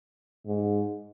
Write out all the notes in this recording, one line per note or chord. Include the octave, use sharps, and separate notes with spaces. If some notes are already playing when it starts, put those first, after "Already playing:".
G#2